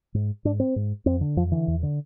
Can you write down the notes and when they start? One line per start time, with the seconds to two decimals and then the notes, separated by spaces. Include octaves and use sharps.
0.14 G#2
0.45 G#2 D4
0.60 C4
0.76 G#2
1.06 F2 C4
1.21 D3
1.37 F2 F3
1.51 D3 E3
1.68 E2
1.83 D3